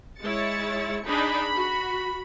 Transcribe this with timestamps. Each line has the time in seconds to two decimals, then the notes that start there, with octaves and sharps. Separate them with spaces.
0.21 G#3 E4 C#5 A6 C#7
1.06 D4 D#4 G#4 B5
1.56 F#4